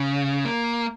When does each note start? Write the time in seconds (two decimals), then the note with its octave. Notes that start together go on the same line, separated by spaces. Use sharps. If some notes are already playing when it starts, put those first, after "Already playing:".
Already playing: C#3
0.45 A#3